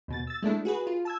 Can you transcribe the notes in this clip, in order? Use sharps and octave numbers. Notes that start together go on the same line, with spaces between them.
D#2 B2 A6
E6 A6
G#3 A3 D4 E4
F#4 G#4 B4
F4
A5 E6 G#6